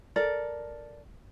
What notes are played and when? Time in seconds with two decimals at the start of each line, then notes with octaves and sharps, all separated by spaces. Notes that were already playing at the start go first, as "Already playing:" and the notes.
0.16 A4 A#4 D5